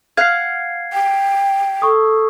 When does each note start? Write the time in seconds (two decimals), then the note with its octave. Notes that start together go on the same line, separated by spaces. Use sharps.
0.17 F5 F#5 G#6 C7
0.93 G5
1.82 A4 C#6 D#6